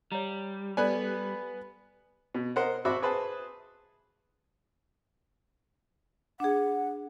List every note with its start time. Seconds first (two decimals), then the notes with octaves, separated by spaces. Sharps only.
0.12 G3 C#5 F5 A#5
0.77 B3 A4 B4 D5 G#5
2.34 B2
2.56 A#4 C5 D#5 F#5
2.85 G#1 F#4 C5 E5 B5 D6
3.02 G#4 B4 C5 A5
6.40 D4 G#4 F#5